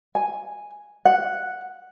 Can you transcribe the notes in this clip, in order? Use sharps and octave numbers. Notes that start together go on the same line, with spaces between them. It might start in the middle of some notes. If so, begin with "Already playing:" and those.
G#5
F#5